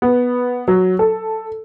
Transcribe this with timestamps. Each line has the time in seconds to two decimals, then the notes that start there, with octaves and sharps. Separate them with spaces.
0.02 B3
0.68 F#3
0.99 A4